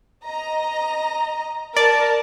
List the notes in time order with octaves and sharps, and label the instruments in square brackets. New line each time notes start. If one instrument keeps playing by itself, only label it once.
[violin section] D#5 A#5
[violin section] A#4 A5 [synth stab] D5